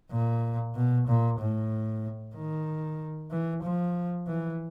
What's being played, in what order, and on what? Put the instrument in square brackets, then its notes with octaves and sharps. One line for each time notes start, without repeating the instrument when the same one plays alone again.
[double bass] A#2
B2
A#2
A2
D#3
E3
F3
E3